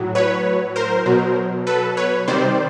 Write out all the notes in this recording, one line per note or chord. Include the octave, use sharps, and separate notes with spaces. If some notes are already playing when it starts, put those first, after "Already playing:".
Already playing: A2 F#3
B4 C#5
A#4 C5
B2 F#3
A4 B4
B4 C#5
C3 D#3 G3 C5 D5